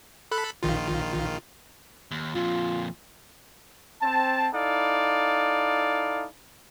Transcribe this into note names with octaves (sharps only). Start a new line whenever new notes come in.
A4 B5 F#6
A#1 D#3 F4
D#2
F2 A#2 F4
C4 A5
D#4 E4 A4 D5 F5